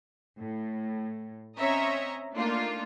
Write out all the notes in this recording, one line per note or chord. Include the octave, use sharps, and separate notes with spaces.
A2
C4 C#4 C#5 D#5 E5 A#5
A3 A#3 D4 D#4 F4